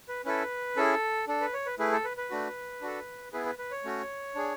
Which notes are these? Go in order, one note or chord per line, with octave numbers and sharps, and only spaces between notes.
B4
C#4 E4 A4 B4
C#4 E4 G#4 A4
D4 A4
B4
C#5
B4
A3 E4 G#4 B4
A4
B4
B4
A3 D4 F#4
D4 F#4 A4
B3 E4 G#4 B4
B4
B4
C#5
A3 C#4 F#4
D4 G#4